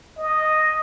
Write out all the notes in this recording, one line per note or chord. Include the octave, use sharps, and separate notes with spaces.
D#5